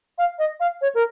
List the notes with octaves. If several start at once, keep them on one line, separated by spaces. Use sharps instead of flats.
F5
D#5
F5
C#5
A#4